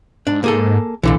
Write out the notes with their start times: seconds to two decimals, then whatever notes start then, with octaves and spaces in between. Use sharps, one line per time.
0.27 G#2 D4
0.44 A#3 G#4 A4
1.03 B1 A#2 D3 E3